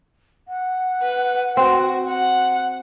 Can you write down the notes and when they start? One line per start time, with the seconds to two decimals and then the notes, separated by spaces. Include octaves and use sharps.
0.48 F#5
1.03 B4
1.57 C4 F#4
2.09 F#5